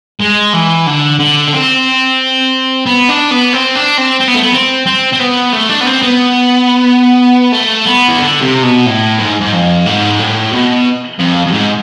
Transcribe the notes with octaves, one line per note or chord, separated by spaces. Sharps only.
G#3
E3
D3
D3
D4
C4
B3
D4
B3
C4
D4
C4
C4
B3
A3
B3
C4
C4
C4
B3
A3
D4
B3
C4
B3
A3
B3
E3
D3
C3
B2
A2
G#2
G#2
F2
G#2
A2
B2
F2
F2
G#2